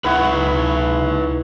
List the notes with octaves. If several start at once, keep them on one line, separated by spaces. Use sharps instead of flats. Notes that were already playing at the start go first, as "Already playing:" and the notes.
C#2 D#4 E4 B4 F#5 C#6